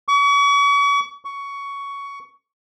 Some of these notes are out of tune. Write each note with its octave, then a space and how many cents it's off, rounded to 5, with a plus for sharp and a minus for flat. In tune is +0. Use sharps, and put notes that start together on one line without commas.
C#6 +40
C#6 +15